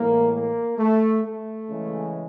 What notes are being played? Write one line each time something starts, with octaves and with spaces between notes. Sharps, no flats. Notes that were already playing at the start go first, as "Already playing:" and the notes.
Already playing: A2 E3 G#3 A#3
A#3
A3
A3
C#3 E3 G#3